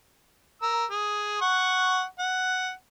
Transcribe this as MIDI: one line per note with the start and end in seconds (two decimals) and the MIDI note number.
0.62 0.85 70
0.62 0.85 88
0.90 1.38 68
1.41 2.03 78
1.41 2.03 85
2.19 2.71 78